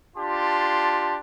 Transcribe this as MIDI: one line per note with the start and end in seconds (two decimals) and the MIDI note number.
0.17 1.18 62
0.17 1.18 65
0.17 1.18 67
0.17 1.18 81
0.17 1.18 84